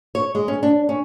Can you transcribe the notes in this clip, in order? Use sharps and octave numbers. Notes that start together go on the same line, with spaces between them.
C#5
G#3
C#4
D4
C#4